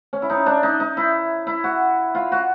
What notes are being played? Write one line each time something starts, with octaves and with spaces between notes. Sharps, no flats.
C#4
E4
D#4
D4
D#4
D#4
E4
E4
F#4
F4
F#4